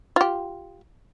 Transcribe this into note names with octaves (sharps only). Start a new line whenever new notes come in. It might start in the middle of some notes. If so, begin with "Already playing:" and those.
F4 G4